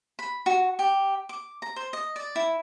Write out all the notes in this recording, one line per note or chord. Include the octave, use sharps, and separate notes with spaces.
B5
F#4
G4
D6
A#5
C5
D#5
D5
E4